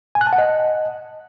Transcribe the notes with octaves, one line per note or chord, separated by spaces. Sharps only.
G#5
F#6
A5
F#5
D#5